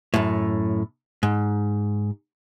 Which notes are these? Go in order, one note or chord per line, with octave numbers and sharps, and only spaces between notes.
F#2 A2
G#2